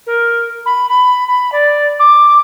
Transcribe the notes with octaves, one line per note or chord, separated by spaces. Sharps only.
A#4
B5
B5
B5
D5
D6